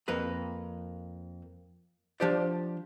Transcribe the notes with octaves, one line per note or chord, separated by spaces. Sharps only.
F2 A#3 B4 B5
F3 D4 G4 C5 D5